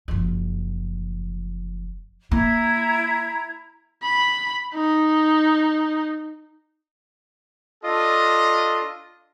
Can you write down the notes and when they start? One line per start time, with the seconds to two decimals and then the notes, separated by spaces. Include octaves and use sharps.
0.08 F#1 F3
2.32 A#3 E4 A#5 G#6
4.03 B5
4.75 D#4
7.84 D4 F4 A4 D#5